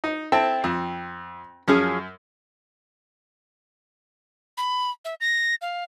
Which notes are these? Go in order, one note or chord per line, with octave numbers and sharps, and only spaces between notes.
D#4
C4 E4 A4 G5
F2 C4
F#2 F3 C#4 G#4
B5
E5
A#6
F5